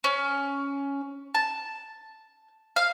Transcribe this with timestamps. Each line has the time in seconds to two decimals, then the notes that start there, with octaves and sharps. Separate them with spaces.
0.04 C#4
1.35 A5
2.76 F5